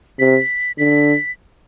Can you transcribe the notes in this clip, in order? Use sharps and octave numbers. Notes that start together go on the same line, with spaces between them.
C3 B6
D3 B6